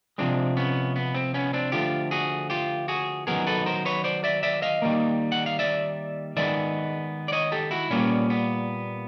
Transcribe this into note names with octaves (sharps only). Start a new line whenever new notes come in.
C3 F3 G#3 C4 D4
B3 C#4
B3
C4
B3 C#4
C4 D4
D3 F3 A3 F4 G4
F#4 G#4
F4 G4
F#4 G#4
D#3 F#3 B3 G#4 A#4
A4 B4
A#4 C5
B4 C#5
C5 D5
D5 E5
D5 E5
D#5 F5
D#3 G3 A#3
F#5
F5
D5 E5
D#3 G#3 B3 D5 E5
D5
C#5 D#5
G4 A4
E4 F#4
A#2 G3 A#3 B3 C#4
B3